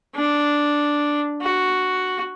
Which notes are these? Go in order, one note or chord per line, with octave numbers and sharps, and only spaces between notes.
D4
F#4